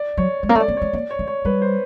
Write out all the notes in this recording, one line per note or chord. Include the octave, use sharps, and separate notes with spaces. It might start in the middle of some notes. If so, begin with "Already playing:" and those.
Already playing: D5
F#3 C#5
G#3 C#5
A#3
A3
D5
A#3
A3 C#5
A#3 D5
C#5
A3
C#5
G3 B4
C5